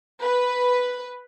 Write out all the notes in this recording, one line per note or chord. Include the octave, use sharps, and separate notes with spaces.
B4